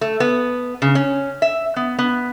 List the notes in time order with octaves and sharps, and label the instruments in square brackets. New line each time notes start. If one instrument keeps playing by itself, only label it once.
[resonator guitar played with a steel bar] A3
B3
C#3
C#4
E5
B3
B3